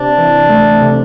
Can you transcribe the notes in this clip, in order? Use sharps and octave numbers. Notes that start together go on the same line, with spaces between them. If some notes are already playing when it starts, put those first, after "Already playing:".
Already playing: C3 D4
E3
A3
C3